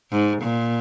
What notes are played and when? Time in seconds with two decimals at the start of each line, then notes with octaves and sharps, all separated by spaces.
0.12 G#2
0.42 A#2